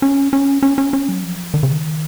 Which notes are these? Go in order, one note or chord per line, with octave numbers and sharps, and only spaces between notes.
C#4
C#4
C#4
C#4
C#4
F#3
F3
D#3
C#3
D#3